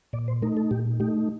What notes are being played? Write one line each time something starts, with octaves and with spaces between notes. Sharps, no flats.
A#2 D5
C5
A3 D#4 A#4
A4
A#2 G4
A3 D#4 G4